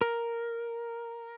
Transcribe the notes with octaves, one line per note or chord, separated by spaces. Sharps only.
A#4